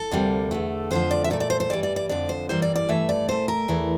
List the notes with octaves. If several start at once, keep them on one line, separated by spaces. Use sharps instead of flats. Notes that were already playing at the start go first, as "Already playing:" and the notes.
Already playing: A4
D2 C3 G3 A#3
E2 D3 A3
F2 D3 F3 C5
D5
E5
A#2 A3 D5
D5
C5
C5
G2 E3 G3 D5
D5
D5
F2 D3 F3 D5
C5
G2 E3 G3 A#3 C5
D5
D5
G2 E3 A3 E5
D5
A#2 A3 C5
A#4
E2 E3 A3